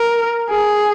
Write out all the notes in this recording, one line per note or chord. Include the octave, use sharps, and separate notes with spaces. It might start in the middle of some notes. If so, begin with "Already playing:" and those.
Already playing: A#4
G#4